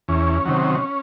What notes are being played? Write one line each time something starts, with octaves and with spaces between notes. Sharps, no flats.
E2 C#4
C3 D#3 F#3